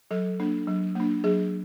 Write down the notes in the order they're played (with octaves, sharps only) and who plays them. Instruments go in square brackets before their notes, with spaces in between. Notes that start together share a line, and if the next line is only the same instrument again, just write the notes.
[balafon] F#3 A4
A#3 D4
F#3
A#3 D4
F#3 G#4